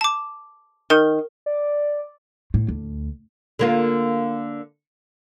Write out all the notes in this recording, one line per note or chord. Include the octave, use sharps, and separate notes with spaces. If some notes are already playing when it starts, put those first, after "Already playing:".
A5 D6
D#3 A#4
D5
A2
D2
D3 A#3 F4